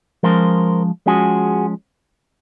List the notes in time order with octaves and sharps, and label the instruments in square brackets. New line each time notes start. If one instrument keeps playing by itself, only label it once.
[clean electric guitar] F3 G#3 C#4 A#4 C5
F3 G#3 C#4 F#4 G#4